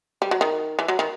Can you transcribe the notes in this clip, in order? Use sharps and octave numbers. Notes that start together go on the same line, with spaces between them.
G3
F#3
D#3
E3
F#3
D#3